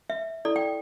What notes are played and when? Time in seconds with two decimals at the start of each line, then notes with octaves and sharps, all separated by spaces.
0.10 E5
0.45 E4 A4 D5
0.56 G5